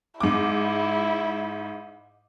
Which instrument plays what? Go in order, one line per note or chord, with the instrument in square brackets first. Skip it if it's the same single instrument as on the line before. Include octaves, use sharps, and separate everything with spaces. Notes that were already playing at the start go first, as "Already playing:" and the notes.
[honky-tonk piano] G#2 D6 [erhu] E4